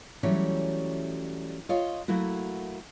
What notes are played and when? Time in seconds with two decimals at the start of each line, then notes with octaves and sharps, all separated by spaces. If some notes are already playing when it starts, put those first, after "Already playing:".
0.23 E3 F#3 G3 A3 C#4 C#5
1.69 F4 C#5 D#5
2.08 F#3 A3 A#3 E4 F#4